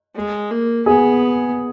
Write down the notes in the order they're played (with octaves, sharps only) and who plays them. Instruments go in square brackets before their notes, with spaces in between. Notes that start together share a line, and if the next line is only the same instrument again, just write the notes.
[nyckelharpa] G#3
A#3
[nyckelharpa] B3 [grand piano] G#4